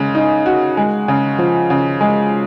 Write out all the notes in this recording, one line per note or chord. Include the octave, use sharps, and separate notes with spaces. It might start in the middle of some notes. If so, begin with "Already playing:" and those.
Already playing: C#3 G#3
D#4
F#4
G#3
C#3
F3
C#3
G#3